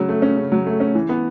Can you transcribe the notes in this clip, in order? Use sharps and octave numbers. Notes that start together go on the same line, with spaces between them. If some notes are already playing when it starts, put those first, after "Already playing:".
Already playing: C#3 F#3
A3
C#4
C#3
F#3
A3
C#4
E3
B3